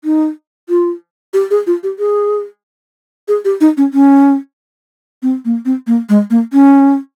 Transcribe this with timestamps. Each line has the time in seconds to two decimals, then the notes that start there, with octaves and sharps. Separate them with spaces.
0.04 D#4
0.69 F4
1.34 G4
1.51 G#4
1.67 F4
1.83 G4
1.99 G#4
3.28 G#4
3.45 G4
3.61 D#4
3.77 C#4
3.93 C#4
5.22 C4
5.45 A#3
5.65 C4
5.87 A#3
6.09 G#3
6.30 A#3
6.53 C#4